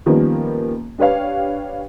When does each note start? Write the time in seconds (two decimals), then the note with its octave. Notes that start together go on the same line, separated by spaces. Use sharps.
0.06 D#3 F3 G3 A#3 B3 C#4
0.98 D4 G4 B4 C#5 F5